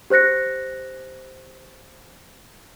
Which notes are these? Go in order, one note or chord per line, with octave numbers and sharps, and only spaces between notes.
G4 C5 F#6 A#6 C#7